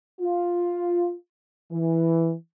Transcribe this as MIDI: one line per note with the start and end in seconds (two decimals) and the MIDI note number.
0.21 1.15 65
1.72 2.34 52